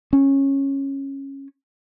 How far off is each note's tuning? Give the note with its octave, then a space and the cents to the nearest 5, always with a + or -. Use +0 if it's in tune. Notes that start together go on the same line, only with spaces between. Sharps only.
C#4 -15